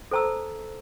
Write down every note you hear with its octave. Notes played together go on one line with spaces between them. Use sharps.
A4 C5 A5 A#5 E6